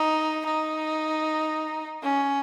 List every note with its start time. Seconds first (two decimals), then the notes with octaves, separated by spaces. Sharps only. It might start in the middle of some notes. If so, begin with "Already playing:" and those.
Already playing: D#4
0.46 D#4
2.03 C#4